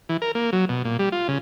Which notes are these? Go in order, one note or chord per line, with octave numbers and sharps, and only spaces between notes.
E3
A#4
A#3
F#3
B2
A#2
G3
F4
C#3